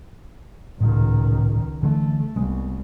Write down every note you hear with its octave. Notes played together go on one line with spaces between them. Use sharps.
D#1 C#2 A2 D#3
D3 E3 A3
C2 G#3 B3